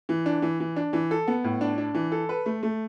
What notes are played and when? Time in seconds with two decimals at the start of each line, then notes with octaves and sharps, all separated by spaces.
0.09 E3
0.26 D4
0.42 E3
0.60 E3
0.76 D4
0.93 E3
1.11 A4
1.28 B3
1.44 A2
1.61 D4
1.78 D4
1.95 E3
2.12 A4
2.29 B4
2.46 A3
2.63 A3